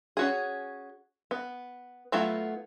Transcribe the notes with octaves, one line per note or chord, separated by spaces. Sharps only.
C#4 F#4 G#4
B3
F#3 A3 B3 E4 F4